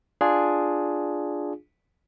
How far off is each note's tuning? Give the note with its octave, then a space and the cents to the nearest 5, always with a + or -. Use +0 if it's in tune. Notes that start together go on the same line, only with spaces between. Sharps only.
D4 +0 F4 +0 G#4 +0